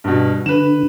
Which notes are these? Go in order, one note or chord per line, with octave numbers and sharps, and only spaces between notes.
G2 B2
D3 B4 E7